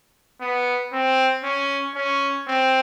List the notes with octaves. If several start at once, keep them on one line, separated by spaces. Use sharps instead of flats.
B3
C4
C#4
C#4
C4